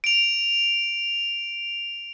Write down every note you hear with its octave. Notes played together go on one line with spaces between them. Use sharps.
D7 F7